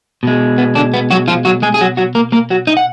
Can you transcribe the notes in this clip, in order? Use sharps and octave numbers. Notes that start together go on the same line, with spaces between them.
B2 G#3
B3
D3 D4
B3
F#3 F#4
F3 F4
F#3 F#4
G#3 G#4
G#4
F#3 F#4
F#3 F#4
A#3 A#4
A#3 A#4
F#3 F#4
D#4 D#5
F#5